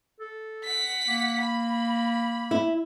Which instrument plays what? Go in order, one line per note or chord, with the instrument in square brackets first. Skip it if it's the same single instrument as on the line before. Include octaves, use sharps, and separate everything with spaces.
[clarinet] A4
[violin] F#5 B6
[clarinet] A#3
[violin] B5
[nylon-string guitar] E4